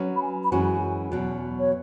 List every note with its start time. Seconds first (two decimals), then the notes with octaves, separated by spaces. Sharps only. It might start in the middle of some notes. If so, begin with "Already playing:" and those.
Already playing: F#3 C#4 F#4 B4
0.16 B5
0.21 G#5
0.44 B5
0.52 F#2 E3 G#3 C#4 F#4 G#5
1.11 E2 B2 F#3
1.59 C#5